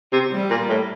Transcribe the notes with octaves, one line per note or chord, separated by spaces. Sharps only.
C3
G3
A#2
A2